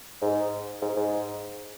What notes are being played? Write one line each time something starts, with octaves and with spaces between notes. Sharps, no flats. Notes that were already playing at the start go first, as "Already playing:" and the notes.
G#2
G#2
G#2